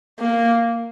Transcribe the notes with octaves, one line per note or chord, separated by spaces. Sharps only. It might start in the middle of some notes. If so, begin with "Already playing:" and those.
A#3